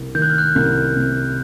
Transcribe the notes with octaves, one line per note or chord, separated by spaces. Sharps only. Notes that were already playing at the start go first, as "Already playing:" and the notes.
Already playing: C2
D#3 G6
F#6
F6
F#6
C2
C3